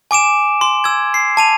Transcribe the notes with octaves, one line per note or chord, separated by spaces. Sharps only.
G#5 D6 D7 E7
C6
E6 G#6
C7
A5 D#7 F7